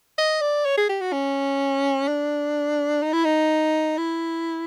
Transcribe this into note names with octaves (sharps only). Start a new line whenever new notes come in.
D#5
D5
C#5
G#4
G4
F#4
C#4
D4
D#4
E4
D#4
E4